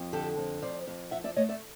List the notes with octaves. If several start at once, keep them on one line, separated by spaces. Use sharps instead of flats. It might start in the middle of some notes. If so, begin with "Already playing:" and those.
Already playing: F2
D3 G4 A4
F2
F2 C5 D5
F2
F3 E5 F#5
D5 E5
A3 C#5 D#5
D5 E5